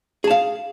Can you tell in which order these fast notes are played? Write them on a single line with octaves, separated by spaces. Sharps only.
G#4 A5 F5